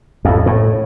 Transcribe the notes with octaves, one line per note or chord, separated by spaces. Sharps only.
F2 A2
A2